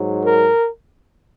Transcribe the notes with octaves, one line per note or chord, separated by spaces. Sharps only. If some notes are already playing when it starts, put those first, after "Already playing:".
Already playing: G#2 F#3
A#4